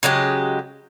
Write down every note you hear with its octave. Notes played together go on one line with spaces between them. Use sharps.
C#3 F#3 G#3 G4